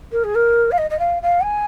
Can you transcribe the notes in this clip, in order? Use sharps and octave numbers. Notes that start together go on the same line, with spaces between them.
A#4
G#4
A#4
F5
D#5
D#5
F5
F5
G#5